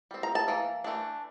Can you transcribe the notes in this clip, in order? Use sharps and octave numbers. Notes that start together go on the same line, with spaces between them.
G3 C4
A#5
A5
E3 A#3
E3 A3 D4